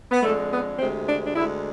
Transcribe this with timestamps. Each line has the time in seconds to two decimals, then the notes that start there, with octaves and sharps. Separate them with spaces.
0.11 B3
0.22 F2 D3 G#3 A3
0.50 B3
0.79 D2 C3 G#3 C4
1.07 D4
1.25 D4
1.35 D2 D3 G#3 E4